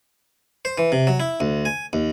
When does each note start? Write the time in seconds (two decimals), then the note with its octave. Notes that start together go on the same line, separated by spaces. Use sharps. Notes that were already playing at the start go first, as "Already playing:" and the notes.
0.65 C5
0.78 E3
0.92 C3
1.07 F#3
1.20 E4
1.40 D2
1.65 G#5
1.93 D#2